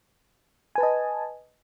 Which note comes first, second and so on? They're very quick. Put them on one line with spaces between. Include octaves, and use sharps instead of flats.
G#5 B4 A5 D#5